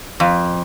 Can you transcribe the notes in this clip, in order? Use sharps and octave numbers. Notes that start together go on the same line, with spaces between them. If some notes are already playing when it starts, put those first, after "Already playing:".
F2